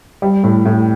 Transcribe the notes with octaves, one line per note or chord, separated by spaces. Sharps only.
G3
A2
A2